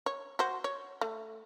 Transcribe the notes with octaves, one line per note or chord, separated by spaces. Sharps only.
C#5
F#4 C5
C#5
A3